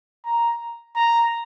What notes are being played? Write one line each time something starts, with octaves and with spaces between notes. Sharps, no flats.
A#5
A#5